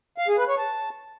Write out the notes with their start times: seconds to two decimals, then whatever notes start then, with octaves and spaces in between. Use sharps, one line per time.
0.18 F5
0.28 G#4
0.38 B4
0.48 C#5
0.58 A5